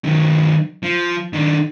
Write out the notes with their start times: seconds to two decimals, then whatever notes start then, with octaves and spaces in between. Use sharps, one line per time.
0.05 D#3 F#3
0.83 F3
1.33 D#3 D4